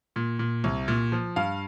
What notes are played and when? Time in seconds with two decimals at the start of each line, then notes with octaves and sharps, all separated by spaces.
0.16 A#2
0.39 A#2
0.64 C2
0.88 A#2
1.12 F3
1.36 G2 F5